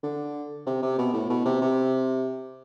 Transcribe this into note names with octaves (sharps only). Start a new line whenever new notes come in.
D3
C3
C3
B2
A2
B2
C3
C3